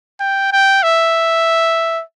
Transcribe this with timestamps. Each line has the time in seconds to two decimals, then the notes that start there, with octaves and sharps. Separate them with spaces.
0.20 G5
0.52 G5
0.83 E5